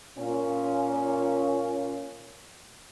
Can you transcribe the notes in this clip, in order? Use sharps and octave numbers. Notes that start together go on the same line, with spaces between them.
A#2 C#4